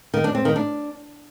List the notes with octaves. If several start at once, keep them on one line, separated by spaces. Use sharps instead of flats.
D#3
D4
C4
D#3
D4